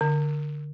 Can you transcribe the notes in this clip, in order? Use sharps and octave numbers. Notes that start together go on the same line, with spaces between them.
D3